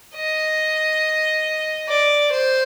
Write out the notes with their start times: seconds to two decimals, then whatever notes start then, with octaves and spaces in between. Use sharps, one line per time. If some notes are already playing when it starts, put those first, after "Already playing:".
0.15 D#5
1.88 D5
2.32 C5